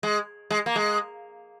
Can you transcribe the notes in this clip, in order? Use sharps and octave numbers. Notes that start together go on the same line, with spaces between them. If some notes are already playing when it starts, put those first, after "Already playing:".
G#3
G#3
A#3
G#3